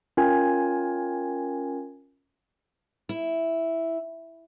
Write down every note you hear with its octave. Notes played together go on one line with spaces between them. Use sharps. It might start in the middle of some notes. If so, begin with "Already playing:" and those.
C#4 F4 A#4 G5 G#5 G#6
E4